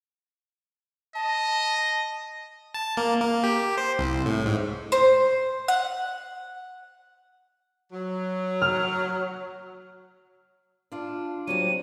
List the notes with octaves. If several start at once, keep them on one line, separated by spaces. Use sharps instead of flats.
D#5 A5
A5
A#3
A#3
G4
C5
C2
A2
G#2
C5
F#5
F#3
F6
D4 F4
F#3 G3 C4 D#7